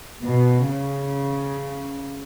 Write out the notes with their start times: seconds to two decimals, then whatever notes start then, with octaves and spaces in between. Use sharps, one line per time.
0.24 B2
0.67 C#3